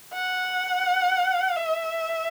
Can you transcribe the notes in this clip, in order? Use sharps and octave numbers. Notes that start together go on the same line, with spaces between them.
F#5
E5